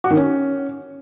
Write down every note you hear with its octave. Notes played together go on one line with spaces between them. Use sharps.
F#4
D#3
C#4